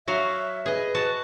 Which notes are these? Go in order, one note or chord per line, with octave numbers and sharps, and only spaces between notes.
F#3 F#4 E5 F5
G#4 B4 D#5
F#4 A5